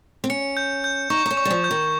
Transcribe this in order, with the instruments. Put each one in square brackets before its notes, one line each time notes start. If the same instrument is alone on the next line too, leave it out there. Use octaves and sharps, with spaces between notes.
[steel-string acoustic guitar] C4
[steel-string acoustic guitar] C#4 [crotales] C#7
[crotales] G6
G6
[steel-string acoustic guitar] D#4 [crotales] C#6
[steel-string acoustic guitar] D#4
C#4
[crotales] C#6
[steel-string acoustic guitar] G3
F3
[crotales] G6
[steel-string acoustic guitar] D#3